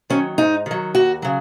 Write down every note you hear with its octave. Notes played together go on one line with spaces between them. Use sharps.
D#3 F#3 C#4
G#2 D#4
D#3 F#3
D#2 F#4
C#3 F#3